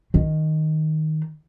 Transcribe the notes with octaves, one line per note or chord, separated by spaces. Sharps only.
D#3